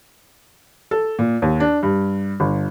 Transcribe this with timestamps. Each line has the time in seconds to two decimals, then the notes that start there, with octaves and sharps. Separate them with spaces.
0.91 A4
1.19 A#2
1.42 D#2
1.60 D4
1.83 G2
2.40 G1